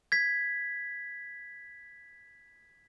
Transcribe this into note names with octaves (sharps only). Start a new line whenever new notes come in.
G#6 B6